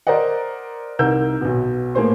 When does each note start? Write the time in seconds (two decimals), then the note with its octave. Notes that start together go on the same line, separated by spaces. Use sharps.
0.07 A#4 C5 D5 D#5 F#5
0.99 C2 D#4 A#4 E6 G6
1.41 B1 B2
1.95 A2 A#3 B3 G#4 C5 C6